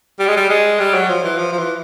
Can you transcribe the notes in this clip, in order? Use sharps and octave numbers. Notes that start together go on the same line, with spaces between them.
G3
G#3
G3
G#3
G3
F#3
F3
E3
F3
F3
E3